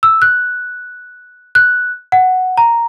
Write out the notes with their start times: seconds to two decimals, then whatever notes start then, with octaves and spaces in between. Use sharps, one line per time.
0.03 E6
0.22 F#6
1.55 F#6
2.12 F#5
2.57 A#5